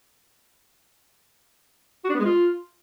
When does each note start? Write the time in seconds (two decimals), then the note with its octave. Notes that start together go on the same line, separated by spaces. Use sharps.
2.04 F#4
2.09 D4
2.14 B3
2.20 G#3
2.25 F4